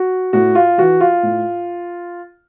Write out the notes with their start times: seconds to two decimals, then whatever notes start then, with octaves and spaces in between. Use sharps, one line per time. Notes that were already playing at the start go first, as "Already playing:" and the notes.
Already playing: F#4
0.33 A2 F#4
0.55 F4
0.78 E3 F#4
1.01 F4
1.23 A2